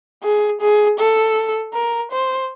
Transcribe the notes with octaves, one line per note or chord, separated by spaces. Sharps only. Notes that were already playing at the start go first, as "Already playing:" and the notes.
G#4
G#4
A4
A#4
C5